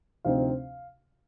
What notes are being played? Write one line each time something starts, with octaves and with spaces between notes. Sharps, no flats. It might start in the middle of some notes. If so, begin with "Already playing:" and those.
D2 C3 F3 C4 D#4 F5